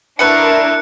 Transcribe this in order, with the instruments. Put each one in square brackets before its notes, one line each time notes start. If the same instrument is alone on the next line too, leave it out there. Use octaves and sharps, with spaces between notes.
[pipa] A3 B4 F#5 [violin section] D4 E4 A#4 [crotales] F#6 C#7